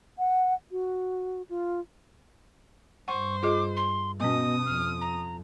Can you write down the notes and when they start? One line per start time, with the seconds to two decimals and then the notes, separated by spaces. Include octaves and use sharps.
0.19 F#5
0.71 F#4
1.49 F4
3.08 G2 C5 F#5 C#6
3.43 F4 G#4 D#5 D6
3.76 C6
4.20 B2 B3 C#4 D#5 D#6
4.66 F2 F6
5.01 A#5